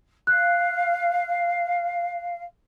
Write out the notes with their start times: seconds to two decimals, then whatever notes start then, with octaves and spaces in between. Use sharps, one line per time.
0.27 F5 F#6